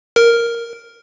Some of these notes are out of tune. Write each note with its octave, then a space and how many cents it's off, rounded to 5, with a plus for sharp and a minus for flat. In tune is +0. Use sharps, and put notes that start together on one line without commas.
A#4 +0